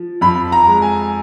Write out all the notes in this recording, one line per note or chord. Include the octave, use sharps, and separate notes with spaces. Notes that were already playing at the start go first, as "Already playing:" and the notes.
Already playing: F3
F2 B5
A#5
G#3
G#5